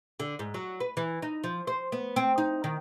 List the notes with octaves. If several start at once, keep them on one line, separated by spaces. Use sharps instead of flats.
D3
G#2
F#3
B4
E3
D#4
F3
C5
B3
C4
D#4
D#3